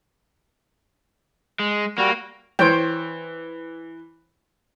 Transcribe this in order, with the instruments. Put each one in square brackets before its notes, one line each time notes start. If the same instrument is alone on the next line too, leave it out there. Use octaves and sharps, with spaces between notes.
[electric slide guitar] G#3
[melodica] G3 F#4 [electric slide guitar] A#3
[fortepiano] E3 [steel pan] C5 C#5 G5